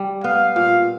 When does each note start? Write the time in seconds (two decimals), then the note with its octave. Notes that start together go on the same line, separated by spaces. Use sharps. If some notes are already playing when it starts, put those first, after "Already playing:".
Already playing: G3
0.24 B3 F5
0.56 A#2 F5